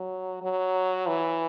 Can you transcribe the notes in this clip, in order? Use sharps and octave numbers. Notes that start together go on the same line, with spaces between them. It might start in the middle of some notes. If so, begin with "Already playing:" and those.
Already playing: F#3
F#3
E3